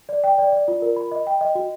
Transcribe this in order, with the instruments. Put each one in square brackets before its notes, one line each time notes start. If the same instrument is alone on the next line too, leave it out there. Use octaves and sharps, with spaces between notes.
[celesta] D5
G5
D5
D5
F4
A#4
B5
D#5
G5
D#5
F#4